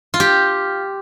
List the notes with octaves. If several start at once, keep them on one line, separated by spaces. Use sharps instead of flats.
F4
G4